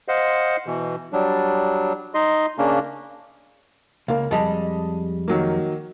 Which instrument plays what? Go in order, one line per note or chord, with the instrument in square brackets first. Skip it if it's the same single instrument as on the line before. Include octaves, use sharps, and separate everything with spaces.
[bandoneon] C5 D#5 F5 F#5
B2 E3
F#3 G3 D4
D#4 D#5 C6
C#3 A#3 C#4 D4
[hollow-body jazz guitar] C#2 [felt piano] A#3 F5
[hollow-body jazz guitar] F2 G3 G#3 [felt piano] D#5 A5
[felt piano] D#3 F#3 A#3